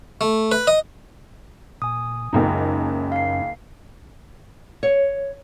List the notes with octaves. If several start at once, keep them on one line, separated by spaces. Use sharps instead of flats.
A3
B4
D#5
A#2 G#5 D#6
F#1 C#2 F#2 C#4 D#4
F5 C7
C#5